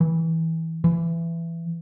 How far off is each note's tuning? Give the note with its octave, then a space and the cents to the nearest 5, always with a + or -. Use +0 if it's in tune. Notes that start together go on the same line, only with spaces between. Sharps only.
E3 -20
E3 +20